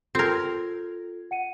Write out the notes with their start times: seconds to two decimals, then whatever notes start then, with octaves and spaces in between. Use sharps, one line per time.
0.15 C4 F4 A4 A#4 G#6
1.31 F#5 C#7 D#7